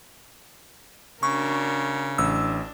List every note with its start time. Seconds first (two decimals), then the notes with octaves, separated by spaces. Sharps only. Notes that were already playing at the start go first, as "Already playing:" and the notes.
1.23 C#3 D4 F#4 A#4 C#6
2.18 A1 D4 E6